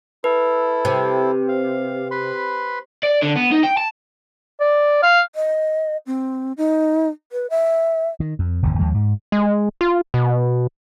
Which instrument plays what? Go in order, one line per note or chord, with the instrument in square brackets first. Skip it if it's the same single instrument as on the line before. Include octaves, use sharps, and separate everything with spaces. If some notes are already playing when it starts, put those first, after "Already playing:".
[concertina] E4 A4 [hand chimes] B4
[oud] C3
[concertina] F5
B4 B5 C6
[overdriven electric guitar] D5
D3
B3
D#4
G5
A5
[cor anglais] D5
F5
[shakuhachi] D#5
C4
D#4
B4
E5
[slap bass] D#3
F2
F1 D#2 G#2 D3
D#2 F3 G#3
G#2
[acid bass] G#3
F4
B2